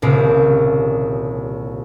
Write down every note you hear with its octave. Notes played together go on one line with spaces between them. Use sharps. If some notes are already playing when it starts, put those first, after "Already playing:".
D#1 C2 A#2 C#3 D7